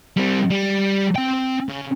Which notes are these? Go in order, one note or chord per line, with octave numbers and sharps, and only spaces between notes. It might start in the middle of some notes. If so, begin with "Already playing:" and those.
G3 C4
G3
C4 G5
C#3